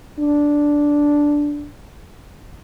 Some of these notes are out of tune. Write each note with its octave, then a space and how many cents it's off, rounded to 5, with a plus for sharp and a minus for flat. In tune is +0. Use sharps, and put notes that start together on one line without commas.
D4 -5